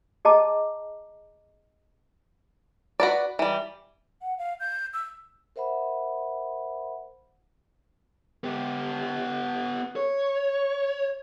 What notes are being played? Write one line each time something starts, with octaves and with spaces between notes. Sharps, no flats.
G#4 D#5 A5 A#5 D6
F#4 B4 D5
E3 G3
F#5
F5
G6
E6
A#4 C5 E5 F#5 B5
B3 G4
C#5